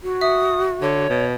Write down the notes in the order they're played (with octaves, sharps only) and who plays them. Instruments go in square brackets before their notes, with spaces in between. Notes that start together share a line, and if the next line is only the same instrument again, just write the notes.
[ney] F#4
[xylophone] E5 [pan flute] D#6
[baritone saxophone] D3 [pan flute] C#5
[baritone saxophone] B2